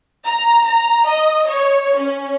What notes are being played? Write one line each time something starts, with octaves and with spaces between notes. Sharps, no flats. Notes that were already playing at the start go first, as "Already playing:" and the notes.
A#5
A#5
D#5
C#5
C#4